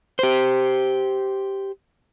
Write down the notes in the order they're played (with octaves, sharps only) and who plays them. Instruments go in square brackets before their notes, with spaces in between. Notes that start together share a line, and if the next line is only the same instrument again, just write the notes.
[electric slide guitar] G4 C5